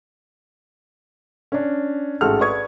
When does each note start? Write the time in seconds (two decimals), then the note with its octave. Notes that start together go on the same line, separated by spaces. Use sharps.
1.52 C#4 D4
2.21 A1 G#2 G#3 F#4 A4 F6
2.40 B4 D5 C#6 D#6 G#6